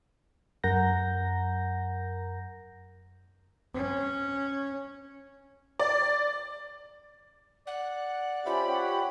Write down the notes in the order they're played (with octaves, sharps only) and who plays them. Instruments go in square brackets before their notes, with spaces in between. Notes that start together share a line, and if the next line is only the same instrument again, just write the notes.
[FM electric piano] F#2 A#4 F#5 A#5 G6 A#6
[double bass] C#4
[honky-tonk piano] D5
[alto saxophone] D5 [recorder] F#5
[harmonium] C#4 G4 [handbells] F4 C5 E5 [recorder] B5
[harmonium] G4 C#5 F#5 [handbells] G5